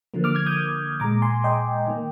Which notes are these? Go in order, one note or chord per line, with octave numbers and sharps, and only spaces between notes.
D3 F3 A#3
D6 F6
F6 G#6
D#6 G6
A#2 G#3 A#5 D6
G#5 C6
D#5 G5
D#3 A#3